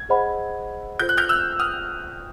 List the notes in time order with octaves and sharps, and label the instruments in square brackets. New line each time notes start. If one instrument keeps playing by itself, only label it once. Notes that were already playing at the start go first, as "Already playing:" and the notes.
Already playing: [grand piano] G#6
[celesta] G#4 C5 D#5 F#5 B5
[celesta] F4 A4 C5 [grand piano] G6
[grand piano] F#6
F6 G6
E6 F#6
D#6 F6